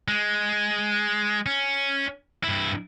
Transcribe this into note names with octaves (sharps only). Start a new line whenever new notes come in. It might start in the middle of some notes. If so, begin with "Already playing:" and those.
G#3
C#4
G2 E4